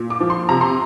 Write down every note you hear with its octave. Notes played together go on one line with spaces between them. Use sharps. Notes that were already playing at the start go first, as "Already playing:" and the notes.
Already playing: A#2
D6
F3
C6
C3 A#5
C6